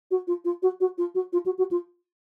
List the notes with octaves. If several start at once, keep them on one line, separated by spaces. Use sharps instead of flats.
F#4
F4
F4
F#4
F#4
F4
F#4
F4
F#4
F#4
F4